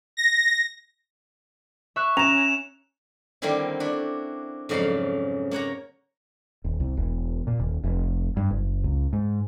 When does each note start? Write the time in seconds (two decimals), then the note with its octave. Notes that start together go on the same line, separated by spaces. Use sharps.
0.17 A#6
1.96 E5 C#6 F#6
2.17 C#4 A#5 E7 F7
3.42 D3 D#3 G3 A#3 C4 E4
3.80 D4 E4 F#4
4.69 F2 G#2 C#3 F#3 D5 F5
5.51 A#3 C#5 F#5 A#5
6.64 D#1
6.80 C2
6.97 E1
7.47 A#2
7.60 D#1
7.84 F1
8.37 G2
8.51 F#1
8.84 C#2
9.13 G#2